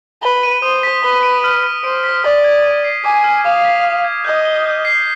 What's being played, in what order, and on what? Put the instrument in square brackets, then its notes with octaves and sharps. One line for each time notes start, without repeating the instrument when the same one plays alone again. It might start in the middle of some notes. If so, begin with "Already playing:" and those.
[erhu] B4 [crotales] G7
[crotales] D#7
[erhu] C5 [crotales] D#6
[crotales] B6
[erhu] B4 [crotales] G7
[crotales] D7
F6
B6
[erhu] C5 [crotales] D7
[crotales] B6
[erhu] D5 [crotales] F6
[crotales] G#6
D#7
C7
[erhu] G#5 [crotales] D6
[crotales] F6
[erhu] F5 [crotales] D#6
[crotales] B6
D#6
G#6
[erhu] D#5 [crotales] G6
[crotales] G7
G6
C7